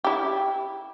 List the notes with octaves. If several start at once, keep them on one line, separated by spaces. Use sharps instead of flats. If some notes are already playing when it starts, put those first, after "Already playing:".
E4 G4